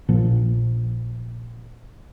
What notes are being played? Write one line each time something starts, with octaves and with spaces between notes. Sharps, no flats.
A#1 A#2 F3